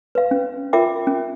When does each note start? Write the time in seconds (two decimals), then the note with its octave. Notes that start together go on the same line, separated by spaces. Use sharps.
0.15 B4 F5
0.31 C#4
0.73 F4 A#4 E5 G5 D6
1.07 C#4